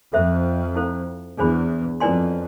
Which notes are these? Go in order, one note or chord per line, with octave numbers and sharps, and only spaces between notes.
F2 A4 C5 E5
E4 A4 C5 F5
E2 D4 G#4 C5 G#5 B5
F2 E4 B4 D5 G#5 C6